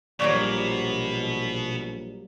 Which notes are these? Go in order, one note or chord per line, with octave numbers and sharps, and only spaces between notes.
A#1 B2 F#3 G3 A#3 D5 C#6